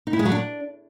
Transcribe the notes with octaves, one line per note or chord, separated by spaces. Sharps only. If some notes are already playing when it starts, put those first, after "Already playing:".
D#4
E4
G#3
F#3
D4